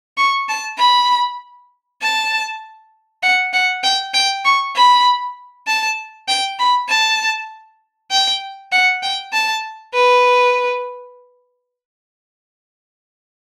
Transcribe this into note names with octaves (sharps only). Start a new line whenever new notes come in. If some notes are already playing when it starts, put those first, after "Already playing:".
C#6
A5
B5
A5
F#5
F#5
G5
G5
C#6
B5
A5
G5
B5
A5
G5
F#5
G5
A5
B4